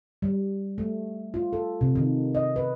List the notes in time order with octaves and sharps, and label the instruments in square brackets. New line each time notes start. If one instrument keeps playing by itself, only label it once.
[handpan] G3
A3
F4
A4
C3
D#3
D#5
B4